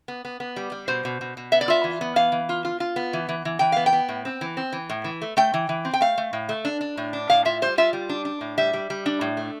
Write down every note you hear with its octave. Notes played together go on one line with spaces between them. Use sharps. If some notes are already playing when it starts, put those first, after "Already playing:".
B3
B3
B3
G3
G3
B2 C5
B2
B2
B2
B3 E5
D5
F4 E5
E3
B3
E3 F5
E3
F4
F4
F4
B3
E3
E3
E3
E3 G5
B3 F5
G5
B3
A2
C4
E3
C4
E3
A2
E3
A3
A3 G5
E3
E3
C4
G5
A3 F5
A3
A2
A3
D4
D4
A2
D4
A2 F5
F4 E5
G3 C5
F4 E5
G3
D4
D4
A2
G3 E5
G3
G3
D4
A2
A3